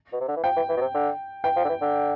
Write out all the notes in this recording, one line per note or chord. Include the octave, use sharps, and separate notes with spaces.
B2
C3
D3
E3
F3 G5
E3
E3
B2
C3
D3
E3 G5
F3
D3
E3
D3